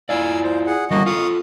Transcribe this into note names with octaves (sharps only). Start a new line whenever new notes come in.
E4 F4 D5 F5 G#5 E6
C5
G#4 F#5
D3 E3 G3 A#3 F#4 D#5
F4 A4 F5 C#6 D#6